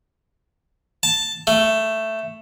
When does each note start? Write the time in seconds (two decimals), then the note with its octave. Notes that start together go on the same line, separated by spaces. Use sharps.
1.03 A5
1.47 A3